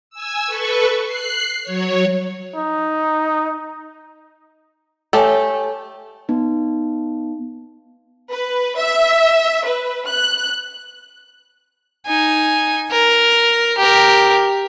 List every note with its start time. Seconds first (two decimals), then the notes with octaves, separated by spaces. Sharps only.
0.10 G#5 E6
0.45 A4 B4 C#6
1.05 F#6 C7
1.63 F#3 C#5
2.56 D#4
5.13 A3 G4 A4 C#5 G#5 A5
6.29 B3 D#4
8.33 B4
8.78 E5
9.66 B4
10.10 F#6
12.07 D#4 G#5
12.91 A#4
13.78 G4 A#4